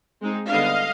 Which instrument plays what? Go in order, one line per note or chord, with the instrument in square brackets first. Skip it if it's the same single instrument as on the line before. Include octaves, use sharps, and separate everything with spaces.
[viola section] G#3 C4 D#4
D3 G3 B3 D4 D#5 F5